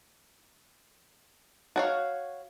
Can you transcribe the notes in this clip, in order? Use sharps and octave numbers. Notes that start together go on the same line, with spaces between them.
F#4 C#5 F5